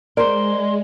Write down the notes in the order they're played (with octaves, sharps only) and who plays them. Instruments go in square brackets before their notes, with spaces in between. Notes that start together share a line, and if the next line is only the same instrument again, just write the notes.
[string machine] G#3 [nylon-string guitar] A#4 C5 [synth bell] D5 [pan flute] C6